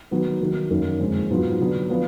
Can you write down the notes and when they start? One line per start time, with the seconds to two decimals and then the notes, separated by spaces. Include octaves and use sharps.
0.11 D#3 F#3 B3
0.40 D#3 F#3 A#3
0.70 F#2 D#3 A#3
0.99 F2 D3 G#3
1.30 G#2 F#3 B3 F4
1.60 D3 F#3 B3 D4
1.89 F3 B3 D4